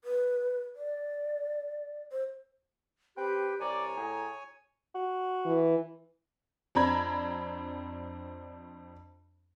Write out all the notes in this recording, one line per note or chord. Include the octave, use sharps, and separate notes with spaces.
B4
D5
C5
C4 G4 B4 G5
C2 C#5 D5 G#5 A#5
A2 G#4
F#4
E3
F2 C4 D4 A#5 B5 G#6